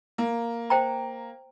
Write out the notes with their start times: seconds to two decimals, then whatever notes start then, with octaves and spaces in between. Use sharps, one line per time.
0.18 A#3
0.70 C5 G5 A#5